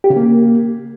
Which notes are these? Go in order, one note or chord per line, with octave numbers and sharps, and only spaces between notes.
G4
C#3
A#3